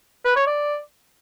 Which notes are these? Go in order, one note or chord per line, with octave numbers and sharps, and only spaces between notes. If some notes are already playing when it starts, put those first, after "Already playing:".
B4
C#5
D5